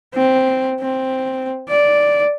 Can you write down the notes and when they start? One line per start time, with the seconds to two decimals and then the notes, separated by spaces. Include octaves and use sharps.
0.14 C4
0.81 C4
1.69 D5